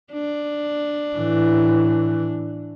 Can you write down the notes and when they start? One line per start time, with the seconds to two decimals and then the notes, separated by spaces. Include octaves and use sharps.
0.13 D4
1.17 A2 E3